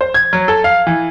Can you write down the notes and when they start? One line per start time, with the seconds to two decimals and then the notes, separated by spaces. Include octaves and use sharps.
0.01 C5
0.14 G#6
0.33 F#3
0.48 A4
0.64 F5
0.87 E3